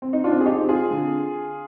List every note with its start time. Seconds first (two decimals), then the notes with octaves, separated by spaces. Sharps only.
0.02 C4
0.13 D#4
0.24 D4 F4
0.31 C4
0.40 G#4
0.46 D#4 G4
0.61 C4
0.69 F4 G#4
0.91 D3